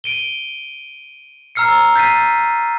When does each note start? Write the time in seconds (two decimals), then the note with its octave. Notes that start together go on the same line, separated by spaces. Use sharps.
0.04 D7 D#7 G7
1.55 A#5 E6 F6 C7 C#7
1.96 G6 A6 B6 C7 D#7